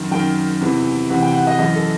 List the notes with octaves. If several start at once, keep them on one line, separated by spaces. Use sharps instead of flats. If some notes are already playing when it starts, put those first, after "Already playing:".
Already playing: F#2 D#3
F#2 D#3 G5
E2 C3 E3
E2 C3 E3 F#5
G5
F#5
D#5
F#2 E3 D#5
A4